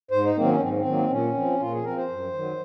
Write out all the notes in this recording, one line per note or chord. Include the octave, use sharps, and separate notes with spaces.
G#2 C5
D#4
D#3 F#3 A#3 C4
C#4
G#2 C4
C4
D#3 F#3 A#3
A#2 C#4
F3 C4
A#2 F4
G#4
F3 C4 A#4
C5
F#2
D#3 F#3